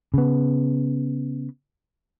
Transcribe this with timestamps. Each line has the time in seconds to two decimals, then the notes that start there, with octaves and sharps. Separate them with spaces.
0.14 C#3 B3